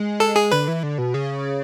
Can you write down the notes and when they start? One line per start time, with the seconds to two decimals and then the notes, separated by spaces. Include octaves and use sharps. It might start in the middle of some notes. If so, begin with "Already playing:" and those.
Already playing: G#3
0.20 A4
0.36 G#4
0.51 D3 B4
0.68 E3
0.83 D3
0.98 B2
1.14 C#3